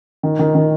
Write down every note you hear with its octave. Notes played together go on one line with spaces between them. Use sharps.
D#3
D#3
D#3